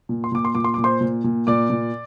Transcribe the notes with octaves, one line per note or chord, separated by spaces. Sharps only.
A#2
C6
A#2 D6
C6
A#2 D6
C6
A#2 D6
C5 C6
A#2
A#2
A#2 D5 D6
A#2